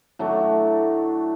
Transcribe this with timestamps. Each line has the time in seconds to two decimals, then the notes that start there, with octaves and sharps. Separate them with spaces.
0.19 A2 F#3 A3 D4